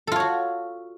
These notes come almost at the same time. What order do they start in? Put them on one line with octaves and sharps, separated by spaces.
A4 F4 C#5 F#4